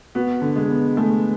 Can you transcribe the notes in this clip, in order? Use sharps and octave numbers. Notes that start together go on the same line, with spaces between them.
B3 F#4
D3
G#3
B3
G#3 A3